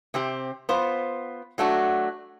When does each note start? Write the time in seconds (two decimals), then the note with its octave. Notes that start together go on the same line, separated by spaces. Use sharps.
0.14 C3 C4 G4
0.69 B3 F4 C5
1.58 F#3 A3 D4 F#4